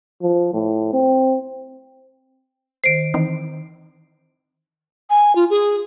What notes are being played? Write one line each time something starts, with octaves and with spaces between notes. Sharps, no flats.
F3
A2
C4
D#3 C5 C7 D7
E3 C4 D#4
G#5
F4
G#4